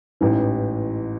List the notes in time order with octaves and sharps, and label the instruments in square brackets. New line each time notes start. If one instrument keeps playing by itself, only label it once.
[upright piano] A1 G#2 E3